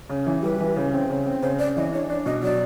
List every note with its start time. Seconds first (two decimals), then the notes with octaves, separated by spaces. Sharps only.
0.09 C#3
0.27 E3
0.43 G3 B4
0.60 E3
0.76 C#3
0.93 C4
1.10 C#3
1.26 C4
1.43 C#3 C5
1.59 C#3 D5
1.77 E3 D#5
1.92 D4 C#5
2.10 D4 D5
2.26 B2 D#5
2.43 F#3 D5